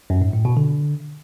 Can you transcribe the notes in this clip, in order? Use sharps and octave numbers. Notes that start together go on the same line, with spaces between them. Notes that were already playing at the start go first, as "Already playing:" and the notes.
F#2
G#2
A2
B2
D3